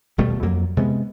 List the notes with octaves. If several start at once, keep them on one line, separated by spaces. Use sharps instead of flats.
D#1 B2 G3 A3
F2 F#3 A#3
C3 G#3 A3 B3